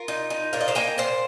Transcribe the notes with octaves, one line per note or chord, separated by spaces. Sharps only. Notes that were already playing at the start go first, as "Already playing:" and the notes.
Already playing: F4 A#4
D#4
D#4
A#2 F5
D#5
C5 F5
A#3 D#5 G5
A#2 C5 F5